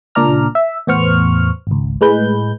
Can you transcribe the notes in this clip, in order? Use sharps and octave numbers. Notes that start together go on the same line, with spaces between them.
C#2 A#2 D4 D5 A#5 F6
E5
E2 A2 B3 C5 C#6 F6
G#1 C#2
A2 G#3 B4 G6